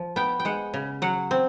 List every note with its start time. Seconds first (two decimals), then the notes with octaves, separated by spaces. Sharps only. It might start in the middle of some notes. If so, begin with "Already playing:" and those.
Already playing: F3
0.16 B3 G5
0.40 G5
0.45 G#3 F#5
0.74 C#3
1.02 F#3 F#5
1.31 C4